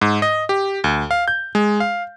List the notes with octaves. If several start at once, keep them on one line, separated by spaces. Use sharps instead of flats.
G#2
D#5
G4
D2
F5
G6
G#3
F5